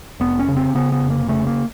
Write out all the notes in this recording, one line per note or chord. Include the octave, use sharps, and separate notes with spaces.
F1 B3
C#4
C#3
C4
C#3 B3
B3
F1
A#3
C#3 A3
A#3